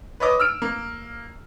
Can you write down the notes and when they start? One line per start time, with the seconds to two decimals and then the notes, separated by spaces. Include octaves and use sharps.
0.20 B4 C#5 D#5 D6
0.40 E6 F6 D7
0.62 A#3